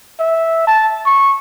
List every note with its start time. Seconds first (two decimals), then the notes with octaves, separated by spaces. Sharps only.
0.19 E5
0.67 A5
1.06 C#6